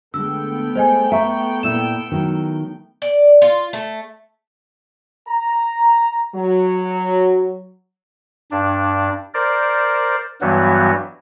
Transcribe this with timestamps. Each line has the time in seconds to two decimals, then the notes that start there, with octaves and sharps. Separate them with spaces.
0.14 D3 G#3 A3 B3 G5 E6
0.76 G#3 C5 D#5 G#5
1.12 E5 A#5 C#6
1.63 A#2 E4 E6 E7
2.12 D#3 F#3 E4
3.02 D5
3.42 F4
3.73 A3
5.27 A#5
6.35 F#3
8.51 G2 D4
9.34 A#4 C5 D5
10.41 G2 E3 F#3 G3 B3 F#4